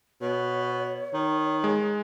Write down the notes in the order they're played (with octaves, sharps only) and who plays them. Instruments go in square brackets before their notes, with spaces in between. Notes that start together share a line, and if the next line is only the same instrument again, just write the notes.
[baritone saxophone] B2 [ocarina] C#5
[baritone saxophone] D#3
[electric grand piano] G#3